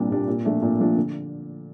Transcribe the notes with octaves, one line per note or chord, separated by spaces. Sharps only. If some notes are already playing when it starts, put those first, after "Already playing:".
Already playing: C2 A#2 G3 D4 G4
A#2 G3 D4 G4
A#2
F3 A3 D4
A#2
F3 A3 D4
D3